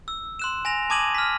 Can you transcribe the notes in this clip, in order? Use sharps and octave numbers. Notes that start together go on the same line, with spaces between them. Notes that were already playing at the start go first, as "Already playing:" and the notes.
E6
C6 F#6 E7
G#5 A#6 F7
A5 D6 D#6 G#6 D#7 F#7
F6 B6